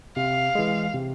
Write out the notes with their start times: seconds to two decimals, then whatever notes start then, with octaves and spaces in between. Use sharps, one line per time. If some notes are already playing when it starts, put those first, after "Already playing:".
0.16 C3 F5
0.55 E3 G#3
0.93 C3